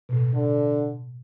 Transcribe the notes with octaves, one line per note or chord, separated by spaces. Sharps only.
B2
A2
D3